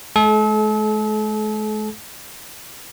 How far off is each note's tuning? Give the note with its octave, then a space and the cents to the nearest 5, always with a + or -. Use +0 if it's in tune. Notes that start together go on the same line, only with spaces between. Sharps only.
G#3 +45 A4 -40